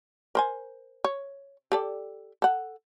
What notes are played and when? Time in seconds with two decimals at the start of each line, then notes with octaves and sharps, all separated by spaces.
0.35 A#4 C5 G#5
1.04 C#5
1.72 G4 A4 D5
2.42 A4 F#5